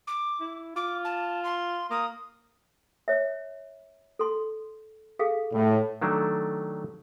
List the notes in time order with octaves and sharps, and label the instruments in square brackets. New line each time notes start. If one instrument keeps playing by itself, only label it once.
[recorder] D6
[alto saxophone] E4
[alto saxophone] F4 [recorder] D6
[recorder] A5
C6
[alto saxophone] A#3 [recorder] D#6
[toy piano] C#5 E5
A4 C6
G#4 A4 F5
[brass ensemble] A2
[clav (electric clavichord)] D#3 F#3 A3 D4